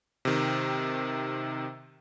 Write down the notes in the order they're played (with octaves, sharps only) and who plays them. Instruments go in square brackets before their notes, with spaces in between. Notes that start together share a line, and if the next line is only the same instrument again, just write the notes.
[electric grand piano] C3 D#3